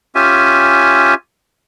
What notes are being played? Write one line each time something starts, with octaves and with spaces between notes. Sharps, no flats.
C#4 F4 G4 E5 G#5